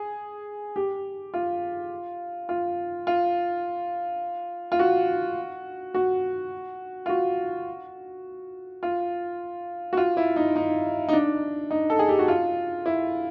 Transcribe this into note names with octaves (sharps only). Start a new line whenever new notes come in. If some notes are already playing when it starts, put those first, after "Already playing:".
Already playing: G#4
G4
F4
F4
F4
F4
F#4
F#4
F4
F#4
F4
F#4
F4
E4
D#4
D#4
D#4
D4
D#4
A4
G#4
G4
F#4
F4
E4